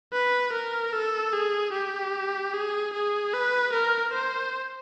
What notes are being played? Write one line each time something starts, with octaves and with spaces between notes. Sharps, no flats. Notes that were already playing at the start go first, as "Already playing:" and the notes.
B4
A#4
A4
G#4
G4
G#4
G#4
B4
A#4
C5